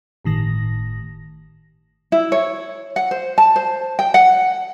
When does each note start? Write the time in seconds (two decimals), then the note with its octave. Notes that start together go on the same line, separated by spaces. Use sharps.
0.24 G1 A2 D#3 A#6
2.12 E4
2.32 C#5
2.96 F#5
3.11 C5
3.38 A5
3.56 C5
3.99 G5
4.14 F#5